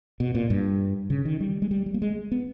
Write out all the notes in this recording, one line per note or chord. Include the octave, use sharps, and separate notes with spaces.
B2
A#2
G2
C#3
D#3
G3
G#3
G3
G3
A#3
G#3
B3